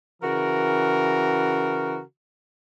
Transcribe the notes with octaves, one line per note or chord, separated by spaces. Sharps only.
C#3 E3 F#4 A#4